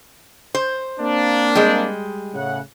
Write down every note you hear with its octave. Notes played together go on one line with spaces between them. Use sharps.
C5
A#3 C4 D4
G3 G#3
A2 C#3 F#5